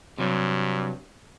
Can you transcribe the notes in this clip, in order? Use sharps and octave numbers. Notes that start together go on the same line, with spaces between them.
G2 C3 F#3